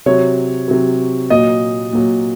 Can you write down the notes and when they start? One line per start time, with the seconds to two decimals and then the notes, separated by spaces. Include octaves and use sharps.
0.06 C3 F#3 C#5
0.68 C3 F#3
1.30 A#2 F#3 D#5
1.92 A#2 F#3